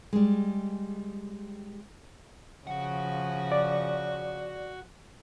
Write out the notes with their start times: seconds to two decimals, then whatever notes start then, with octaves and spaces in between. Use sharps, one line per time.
0.13 G3 G#3
2.67 C#3 F3 F#4 F#5
3.52 D5